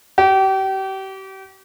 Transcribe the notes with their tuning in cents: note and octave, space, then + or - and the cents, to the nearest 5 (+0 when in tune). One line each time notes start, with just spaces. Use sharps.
G4 -35